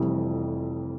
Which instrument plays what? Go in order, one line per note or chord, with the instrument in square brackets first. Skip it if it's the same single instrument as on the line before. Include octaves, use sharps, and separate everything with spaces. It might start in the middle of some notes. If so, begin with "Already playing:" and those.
Already playing: [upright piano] F1 F2 E3 G3